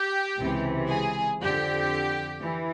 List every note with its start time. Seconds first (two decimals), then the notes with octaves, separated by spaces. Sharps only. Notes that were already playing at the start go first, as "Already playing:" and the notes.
Already playing: G4
0.39 C#2 C3 E3
0.89 G#4
1.41 F2 D3 G4
2.43 E3